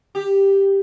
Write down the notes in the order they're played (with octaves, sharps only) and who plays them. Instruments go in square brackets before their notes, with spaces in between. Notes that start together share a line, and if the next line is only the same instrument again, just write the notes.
[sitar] G4